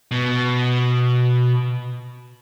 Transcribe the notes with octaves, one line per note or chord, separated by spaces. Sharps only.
B2